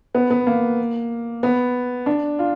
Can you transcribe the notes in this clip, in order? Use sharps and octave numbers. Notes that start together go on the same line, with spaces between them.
B3
B3
A#3
B3
D4
F4